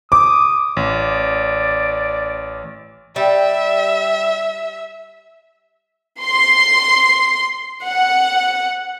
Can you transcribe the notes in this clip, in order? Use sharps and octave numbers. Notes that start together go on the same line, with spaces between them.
D6 D#6
A1 D5
G3 E5
C6
F#5